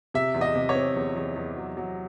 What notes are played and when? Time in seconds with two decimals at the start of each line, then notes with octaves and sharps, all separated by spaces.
0.14 C3 E5
0.34 E2
0.41 D#5
0.55 C3
0.69 C#5
0.75 C4
0.96 E2
1.16 E2
1.36 E2
1.56 F#3
1.77 F#3